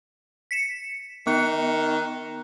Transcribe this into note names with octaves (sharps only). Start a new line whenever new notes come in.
B6 C#7 E7
D#3 B3 F#6 C#7